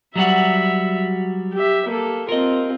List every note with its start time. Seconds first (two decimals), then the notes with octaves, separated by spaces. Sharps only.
0.16 F#3 G3 F#4 E5
1.53 G4 E5
1.88 A#3 A4
2.29 C4 F4 A#4 D#5